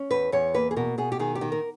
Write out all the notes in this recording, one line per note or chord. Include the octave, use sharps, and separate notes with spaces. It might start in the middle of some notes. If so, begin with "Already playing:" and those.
Already playing: C#4
E2 B4
E2 C#5
A#3 B4
G#4
B2 A#4
B2 G#4
G4
D#3 G#4
G4
D#3
A#4